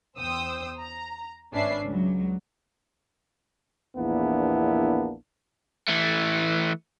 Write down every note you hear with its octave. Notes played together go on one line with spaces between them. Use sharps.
E2 C5 G5 D#6 E6
A#5
G#1 C#4 D4 B4 E5 C7
C#2 F#3
A#1 E2 A#3 B3 D4 E4
E3 A3